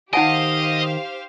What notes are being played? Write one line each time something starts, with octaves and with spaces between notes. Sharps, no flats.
D#3 D#4 G4 C5 D#5 F5 F#5 G#5